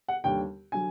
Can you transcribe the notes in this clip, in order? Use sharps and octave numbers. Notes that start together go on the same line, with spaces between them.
F#5
D#2 D3 G3 G5
D3 F#3 G#5